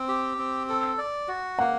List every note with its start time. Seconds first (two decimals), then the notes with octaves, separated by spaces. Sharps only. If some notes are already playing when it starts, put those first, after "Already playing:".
Already playing: C4
0.08 G4
0.38 C4
0.69 A4
0.98 D5
1.28 F#4
1.59 A#3 F#5